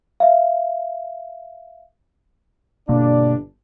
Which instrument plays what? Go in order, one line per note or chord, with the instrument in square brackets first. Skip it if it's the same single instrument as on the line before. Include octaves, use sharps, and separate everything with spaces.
[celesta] E5 F5
[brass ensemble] G1 D4 D5 [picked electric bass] B2 A#3